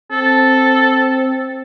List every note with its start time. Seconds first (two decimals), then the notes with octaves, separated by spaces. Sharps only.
0.11 C4 A4